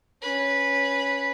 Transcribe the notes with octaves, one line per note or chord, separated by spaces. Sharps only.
C#4 B4